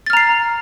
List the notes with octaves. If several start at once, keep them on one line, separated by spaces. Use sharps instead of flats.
A#5 F6 A6 C7